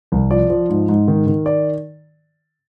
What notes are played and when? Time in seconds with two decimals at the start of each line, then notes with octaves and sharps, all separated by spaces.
0.12 C2
0.31 F3 D5
0.50 F3
0.69 G#2
0.89 G#2
1.08 D#3
1.27 D#3
1.46 D5